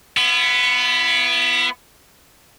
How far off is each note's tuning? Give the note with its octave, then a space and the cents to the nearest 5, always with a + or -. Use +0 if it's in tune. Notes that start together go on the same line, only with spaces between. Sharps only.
B3 +0 E4 +40